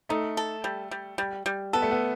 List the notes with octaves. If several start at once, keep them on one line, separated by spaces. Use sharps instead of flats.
A3 D#4
A4
G3
G3
G3
G3
B3 A4
A3
B3